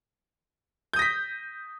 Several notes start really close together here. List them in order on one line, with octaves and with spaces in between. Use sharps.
G6 D#6 A#6 B6